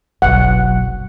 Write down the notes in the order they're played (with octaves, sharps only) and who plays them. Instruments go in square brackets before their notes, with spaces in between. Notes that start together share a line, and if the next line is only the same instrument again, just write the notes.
[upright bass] F#1 B1 [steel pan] F#5